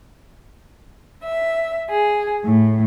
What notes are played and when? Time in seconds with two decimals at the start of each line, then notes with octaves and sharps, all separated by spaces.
1.24 E5
1.90 G#4
2.44 A2